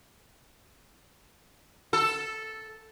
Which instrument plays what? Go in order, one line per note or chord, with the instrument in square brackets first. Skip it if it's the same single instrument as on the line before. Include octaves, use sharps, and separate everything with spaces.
[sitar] A4